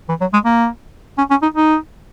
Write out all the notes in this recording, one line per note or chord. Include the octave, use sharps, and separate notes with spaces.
E3
F#3
G#3
A#3
C#4
C#4
D#4
D#4